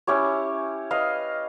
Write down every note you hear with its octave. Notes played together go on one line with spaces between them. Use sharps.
C#4 E4 G4 C#5
B4 D#5 F5